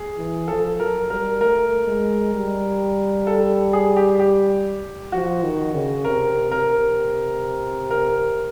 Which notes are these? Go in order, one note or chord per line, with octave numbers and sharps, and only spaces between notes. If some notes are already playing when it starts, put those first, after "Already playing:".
Already playing: G#4
E3
F3 A4
F#3 A#4
G3 A#4
A3 A#4
G#3
G3
A4
G#4
G4
G4
F3 F#4
D#3
C#3
C3 A#4
C3 A#4
A#4